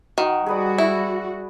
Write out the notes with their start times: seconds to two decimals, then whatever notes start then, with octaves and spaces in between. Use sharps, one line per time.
0.18 D#3 F#4
0.46 G3 F#4 G#4 B4 D5
0.78 E4